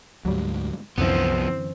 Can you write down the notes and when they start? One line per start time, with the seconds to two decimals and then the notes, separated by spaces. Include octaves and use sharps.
0.25 D2 G#2 F#3 G3
0.98 C2 F#2 D3 E3 F3 B3 C4